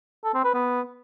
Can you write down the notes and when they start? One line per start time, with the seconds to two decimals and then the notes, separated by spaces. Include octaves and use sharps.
0.24 A4
0.34 C4
0.44 B4
0.54 B3